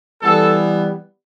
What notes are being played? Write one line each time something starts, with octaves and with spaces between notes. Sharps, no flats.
E3 G3 B3 A4